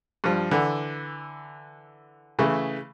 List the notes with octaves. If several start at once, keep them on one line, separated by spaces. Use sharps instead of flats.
G2 F3
D3 E3
C#3 E3 A3